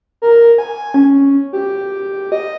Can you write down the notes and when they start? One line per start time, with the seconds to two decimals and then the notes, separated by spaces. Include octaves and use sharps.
0.22 A#4
0.58 G#5
0.94 C#4
1.53 G4
2.32 D#5